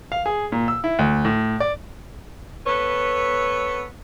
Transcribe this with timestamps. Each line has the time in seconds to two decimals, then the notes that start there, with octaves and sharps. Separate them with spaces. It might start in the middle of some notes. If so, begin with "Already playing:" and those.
0.12 F5
0.26 G#4
0.52 A#2
0.68 E6
0.84 E4
0.99 D2
1.25 A2
1.60 D5
2.66 B3 A4 B4 C#5